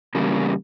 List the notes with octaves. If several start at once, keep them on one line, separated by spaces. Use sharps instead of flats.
E2 C#3 G3 A#3